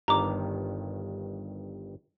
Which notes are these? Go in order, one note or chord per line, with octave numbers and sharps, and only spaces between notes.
G1 G2 D#3 A#5 D6